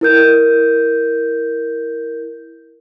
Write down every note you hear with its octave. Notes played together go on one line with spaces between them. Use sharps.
E4 A#4 G6